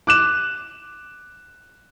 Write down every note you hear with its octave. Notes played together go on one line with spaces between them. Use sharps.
D6 F#6 E7